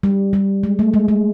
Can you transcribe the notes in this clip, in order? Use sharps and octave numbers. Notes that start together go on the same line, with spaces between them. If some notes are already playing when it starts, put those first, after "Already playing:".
G3
G3
G#3
A3
G#3
G#3